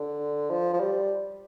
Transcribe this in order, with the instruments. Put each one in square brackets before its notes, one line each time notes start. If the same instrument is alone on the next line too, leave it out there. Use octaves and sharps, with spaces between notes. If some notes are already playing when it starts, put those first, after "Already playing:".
Already playing: [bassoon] D3
F3
F3
G3